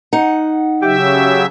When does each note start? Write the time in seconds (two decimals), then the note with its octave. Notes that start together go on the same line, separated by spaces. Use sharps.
0.13 D#4 F#5
0.82 C#3 F#3 G4 E5